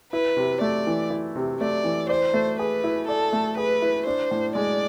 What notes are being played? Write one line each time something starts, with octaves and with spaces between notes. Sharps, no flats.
E4 B4
C3
A3 D5
E3
E4
C3
A3 D5
E3
C5 D5
A3
G#4 B4
E4
A4 D5
A3
G#4 B4
E4
D4 C5
A2
G#3 D5